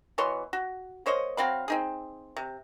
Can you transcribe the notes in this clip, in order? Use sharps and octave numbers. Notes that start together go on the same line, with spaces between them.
B2 E3 C#5 C6
F#4
A#3 C5 C#5 D#5
F#3 C4 F5 B5
C4 D#4 G#4
C3